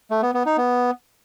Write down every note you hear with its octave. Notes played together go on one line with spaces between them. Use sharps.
A3
B3
B3
D#4
B3